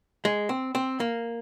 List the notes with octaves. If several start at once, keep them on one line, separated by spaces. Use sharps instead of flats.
G#3
C4
C4
A#3